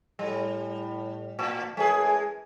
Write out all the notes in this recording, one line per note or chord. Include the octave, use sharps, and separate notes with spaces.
A2 G3
A2
F#2 E3 G#3 G#4 G#5